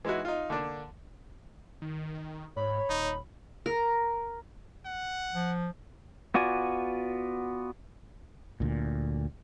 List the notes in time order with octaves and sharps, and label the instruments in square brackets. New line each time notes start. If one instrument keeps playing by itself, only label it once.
[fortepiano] E3 G#3 D#4 E4 F#4
D#4 F4
D3 A#3 D4
[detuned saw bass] D#3
[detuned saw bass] G#2 [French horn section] C#5 [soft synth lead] B5
[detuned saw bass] D#1 [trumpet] D#4
[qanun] A#4
[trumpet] F#5
[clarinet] F3
[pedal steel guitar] B3 F4 F#4 D5 G#5
[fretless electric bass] D2 A#2